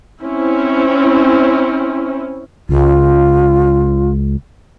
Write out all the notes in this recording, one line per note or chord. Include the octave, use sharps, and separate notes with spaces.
C4 C#4 E4
C#2 F4